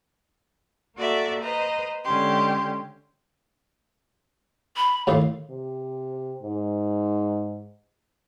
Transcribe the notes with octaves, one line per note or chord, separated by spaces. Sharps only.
A#3 F#4 A4 D5 E5
B4 C5 D#5 A#5
D3 G#3 C#4 G4 C6
B5
D#2 A2 F4 F5
C3
G#2